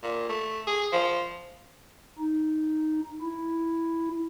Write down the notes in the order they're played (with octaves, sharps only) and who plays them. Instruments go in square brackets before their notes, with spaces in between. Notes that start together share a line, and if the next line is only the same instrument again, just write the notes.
[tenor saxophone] A#2
A3
G#4
F3
[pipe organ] D#4
E4